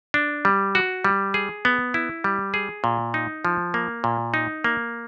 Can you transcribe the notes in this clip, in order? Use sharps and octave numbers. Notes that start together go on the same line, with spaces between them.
D4
G3
F#4
G3
G#4
B3
E4
G3
G#4
A#2
D#4
F3
A#3
A#2
D#4
A#3